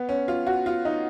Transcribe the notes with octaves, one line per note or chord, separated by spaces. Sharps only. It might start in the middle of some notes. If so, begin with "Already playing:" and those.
Already playing: B3
C#4
F4
F#4
F4
D#4